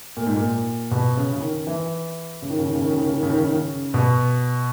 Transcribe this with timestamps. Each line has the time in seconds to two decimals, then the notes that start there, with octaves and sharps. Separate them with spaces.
0.17 A#2
0.26 G#2
0.36 A#2
0.91 B2
1.17 C#3
1.33 C#3
1.42 D#3
1.67 E3
2.42 C#3
2.50 D#3
2.59 C#3
2.67 D#3
2.75 C#3
2.83 D#3
2.90 C#3
2.98 D#3
3.06 C#3
3.14 D#3
3.23 C#3
3.30 D#3
3.38 C#3
3.46 D#3
3.53 C#3
3.94 B2